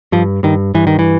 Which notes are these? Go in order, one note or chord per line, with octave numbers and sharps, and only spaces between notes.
G2 F3
G2 D#3
G2 E3
D#3
E3